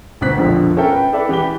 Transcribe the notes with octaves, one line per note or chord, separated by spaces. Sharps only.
G1 D2 C4 F#6 B6
E1 A#1 F2 D3 F3
C#4 A4 A#4 E5 G5
B4 G5
E4 A4 B4 D5 E5
E3 G4 B4 G5 G7